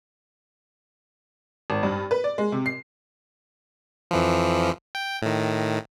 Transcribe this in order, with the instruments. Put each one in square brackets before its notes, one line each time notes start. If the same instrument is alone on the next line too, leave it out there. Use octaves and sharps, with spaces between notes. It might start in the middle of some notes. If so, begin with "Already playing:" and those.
[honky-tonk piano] G#1
G2
B4
D5
G#3
C3
C7
[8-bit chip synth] F2 E3 F3
G5
A2 D#3